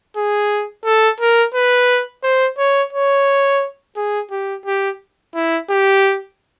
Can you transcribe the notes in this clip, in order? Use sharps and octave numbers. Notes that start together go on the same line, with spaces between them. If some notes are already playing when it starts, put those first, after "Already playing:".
G#4
A4
A#4
B4
C5
C#5
C#5
G#4
G4
G4
E4
G4